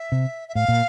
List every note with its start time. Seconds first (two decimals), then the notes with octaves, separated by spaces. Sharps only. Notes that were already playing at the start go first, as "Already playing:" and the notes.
Already playing: E5
0.12 C3
0.49 E5
0.55 A2 F5
0.68 A#2